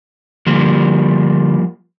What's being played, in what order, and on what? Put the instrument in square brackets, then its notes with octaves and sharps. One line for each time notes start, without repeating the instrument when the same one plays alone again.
[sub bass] D3 [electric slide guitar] F3 G3 A#3